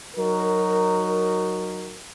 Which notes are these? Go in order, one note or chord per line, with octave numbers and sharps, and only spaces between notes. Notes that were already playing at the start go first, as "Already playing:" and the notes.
F#3 D#4 F#4 A#4